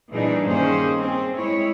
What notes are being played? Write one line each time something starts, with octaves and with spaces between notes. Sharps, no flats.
A#2 E3 G3 D4 D#4 G#4
G2 D#3 A#3 C#4 G#4 C5
C4 G#4
G#3 E4 C#5